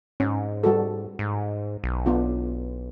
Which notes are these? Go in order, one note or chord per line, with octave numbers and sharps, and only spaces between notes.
G#2 C#4
G3 F#4 A4
G#2
B1
B3 D4 F4